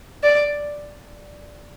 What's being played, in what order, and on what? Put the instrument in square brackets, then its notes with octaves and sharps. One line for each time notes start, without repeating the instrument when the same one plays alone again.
[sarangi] D5